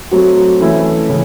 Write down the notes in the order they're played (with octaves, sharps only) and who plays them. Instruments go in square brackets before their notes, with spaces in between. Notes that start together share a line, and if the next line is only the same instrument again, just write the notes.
[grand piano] F#3 A3 C4 F#4
E3 A3 C#4 E4
C#3 E3